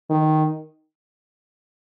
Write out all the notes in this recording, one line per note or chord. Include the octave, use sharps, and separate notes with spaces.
D#3